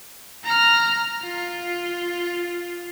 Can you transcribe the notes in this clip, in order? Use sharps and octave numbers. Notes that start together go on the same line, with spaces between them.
A#5 F6
F4